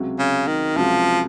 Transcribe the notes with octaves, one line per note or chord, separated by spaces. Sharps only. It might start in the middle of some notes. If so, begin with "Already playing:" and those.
Already playing: C#2 C3 F#3
C#3
D#3
C#2 C3 F3 F#3